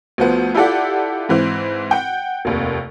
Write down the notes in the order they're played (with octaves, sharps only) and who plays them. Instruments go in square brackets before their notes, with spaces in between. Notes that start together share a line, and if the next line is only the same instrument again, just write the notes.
[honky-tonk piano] D2 F3 B3
E4 F4 G4 A4 D5 F#5
G#2 E3 C4
F#5 G5
F1 D#2 C3